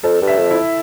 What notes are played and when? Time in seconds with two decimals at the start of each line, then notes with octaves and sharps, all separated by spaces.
0.03 F2 A4
0.22 G2
0.27 E5
0.39 F2
0.51 E4